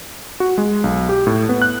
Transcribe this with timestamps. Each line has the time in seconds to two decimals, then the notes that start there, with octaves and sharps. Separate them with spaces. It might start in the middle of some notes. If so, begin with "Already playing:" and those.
0.40 F#4
0.58 G#3
0.84 B1
1.09 G4
1.27 A2
1.49 B3
1.62 F#6